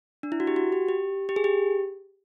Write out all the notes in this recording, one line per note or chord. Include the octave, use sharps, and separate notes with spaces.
D4
E4
F#4
G4
F#4
G4
G4
G4
G#4
G4